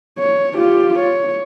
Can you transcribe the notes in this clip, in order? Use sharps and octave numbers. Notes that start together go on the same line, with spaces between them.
C#5
F4 G4
C#5